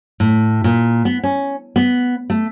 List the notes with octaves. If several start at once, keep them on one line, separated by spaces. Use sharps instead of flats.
A2
A#2
B3
C#4
B3
A3